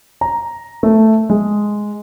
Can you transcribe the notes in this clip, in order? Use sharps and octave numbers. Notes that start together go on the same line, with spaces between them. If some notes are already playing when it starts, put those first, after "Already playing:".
A#5
A3
G#3